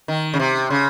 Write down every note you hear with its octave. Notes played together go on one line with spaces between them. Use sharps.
D#3
C#3
C3
C#3